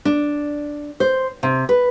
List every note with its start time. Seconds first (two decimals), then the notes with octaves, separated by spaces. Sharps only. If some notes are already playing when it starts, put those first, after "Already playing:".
0.05 D4
1.00 C5
1.43 C3
1.69 B4